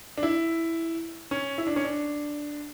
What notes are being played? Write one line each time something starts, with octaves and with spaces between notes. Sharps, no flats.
D4
E4
C#4
E4
D4
C#4
D4